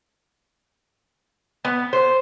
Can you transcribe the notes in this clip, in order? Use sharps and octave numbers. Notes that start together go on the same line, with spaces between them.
B3
C5